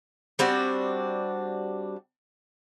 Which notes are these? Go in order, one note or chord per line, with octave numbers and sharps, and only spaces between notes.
G3 C4 D4 F#4